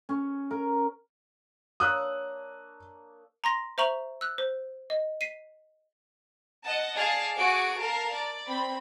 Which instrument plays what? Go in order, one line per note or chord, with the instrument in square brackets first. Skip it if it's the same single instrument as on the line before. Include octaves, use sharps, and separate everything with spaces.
[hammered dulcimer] C#4
A#4
[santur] A#3 D4 C#5 [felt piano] D#6 E6 F#6
[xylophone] A#5 C6 A#6
C5 E5 A#5 C#6 F#7
E6 F#6
C5
D#5
B6 C7 D#7
[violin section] D#5 F#5 A5
G#4 D5 F5 A5
F#4 G#4 D6 D7
A#4 F5 A5
D5
C4 B5